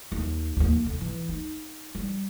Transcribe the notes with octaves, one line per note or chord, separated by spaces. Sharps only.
D#2
D#2 A#3
D3
E3
D#4
G3